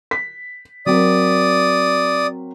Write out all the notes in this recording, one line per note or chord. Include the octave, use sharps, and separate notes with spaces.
B6
F#3 C4 A#4 D5 D#6